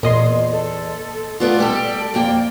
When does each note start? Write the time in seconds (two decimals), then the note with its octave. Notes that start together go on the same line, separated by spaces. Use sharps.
0.03 E2 A#2 D#5 C6
0.52 A4
1.40 A3 B3 F4 D5
1.59 G3 G4 A4
2.14 F2 A#3 G5